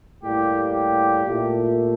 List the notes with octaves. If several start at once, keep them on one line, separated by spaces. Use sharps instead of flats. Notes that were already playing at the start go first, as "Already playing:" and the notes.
A2 G3 A#3 G4
G4
A#2 A3